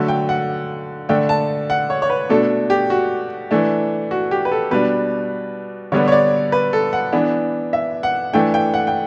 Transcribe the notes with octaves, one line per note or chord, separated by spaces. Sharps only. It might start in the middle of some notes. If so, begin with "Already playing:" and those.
Already playing: D3 F#3 A3
G5
F#5
D3 A3 D4 G5
A5
F#5
C#5
C#5
B4
B2 A3 D4 A4
G4
F#4
E3 A3 D4
F#4
G4
B4
A4
B2 G3 D4 B4
D3 G3 B3 D4 C#5
C#5
D5
B4
A4
F#5
E3 B3 D4
E5
F#5
E3 A3 D4 G5
G5
F#5
G5